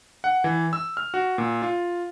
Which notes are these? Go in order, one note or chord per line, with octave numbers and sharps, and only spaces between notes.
F#5
E3
E6
F6
F#4
A#2
F4